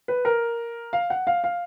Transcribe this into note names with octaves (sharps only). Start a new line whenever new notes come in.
B4
A#4
F5
F#5
F5
F5